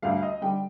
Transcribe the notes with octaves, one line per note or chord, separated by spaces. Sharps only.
D2 D3 G3 F5
D#5
D3 G3 G5